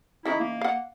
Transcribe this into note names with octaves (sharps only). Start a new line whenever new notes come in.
C#3 E3 D#4 E4
A#3
F5 F#5